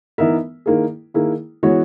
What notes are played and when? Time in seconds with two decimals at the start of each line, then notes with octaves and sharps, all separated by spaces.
0.18 E3 B3 D#4 A#4 E5
0.66 D#3 A#3 E4 G#4
1.14 D#3 A#3 E4 G#4
1.63 E3 G#3 B3 F#4 C#5